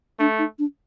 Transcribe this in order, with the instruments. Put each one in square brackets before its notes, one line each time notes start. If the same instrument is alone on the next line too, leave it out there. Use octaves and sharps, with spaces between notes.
[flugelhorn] A3 [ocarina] D4
[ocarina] D#4
D4